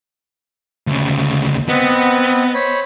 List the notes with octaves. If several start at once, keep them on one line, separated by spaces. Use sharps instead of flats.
D2 C#3
B3 C4 D#5 F#5
C5 C#5 B5